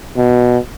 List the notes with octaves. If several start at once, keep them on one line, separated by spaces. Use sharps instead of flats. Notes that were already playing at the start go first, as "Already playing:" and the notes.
B2